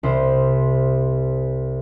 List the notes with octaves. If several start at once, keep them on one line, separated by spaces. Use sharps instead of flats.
C2 C5